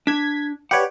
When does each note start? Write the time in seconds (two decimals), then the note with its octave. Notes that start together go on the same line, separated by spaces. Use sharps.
0.07 D4 G#6 B6
0.71 G4 B4 C#5 D5 F#5